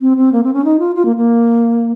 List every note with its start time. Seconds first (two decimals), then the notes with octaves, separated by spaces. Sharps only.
0.01 C4
0.17 C4
0.32 A#3
0.44 C4
0.53 C#4
0.65 D#4
0.79 F4
0.95 F4
1.05 A#3
1.16 A#3